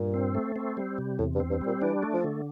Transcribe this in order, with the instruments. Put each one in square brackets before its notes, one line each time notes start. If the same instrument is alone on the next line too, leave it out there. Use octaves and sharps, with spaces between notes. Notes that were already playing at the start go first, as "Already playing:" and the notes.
Already playing: [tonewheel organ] G2 [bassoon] A#2
[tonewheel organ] C4
A3
C4
G3
C3
[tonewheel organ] E2 [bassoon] A2
[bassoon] G2
[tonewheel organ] C4
[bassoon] G2
[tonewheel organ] G3
[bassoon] A#2
[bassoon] E3 [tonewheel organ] D4
[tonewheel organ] A3
[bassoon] F3
[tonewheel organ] D3